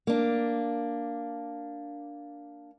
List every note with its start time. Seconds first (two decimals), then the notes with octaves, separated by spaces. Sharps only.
0.07 A#3 D4